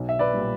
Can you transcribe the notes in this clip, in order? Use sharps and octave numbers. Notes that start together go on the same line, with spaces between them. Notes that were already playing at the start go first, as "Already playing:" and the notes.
Already playing: B1
E5
B4 D5
A#2 G3